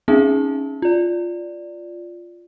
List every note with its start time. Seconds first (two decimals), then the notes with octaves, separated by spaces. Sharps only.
0.08 C4 C#4 D#4 G#4 E5 A5
0.82 F4 D5